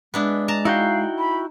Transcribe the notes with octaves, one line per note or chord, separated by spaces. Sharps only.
G#3 B3 D4 E4
A5 A#5
D#4 E4 F#4 F5 G5
B5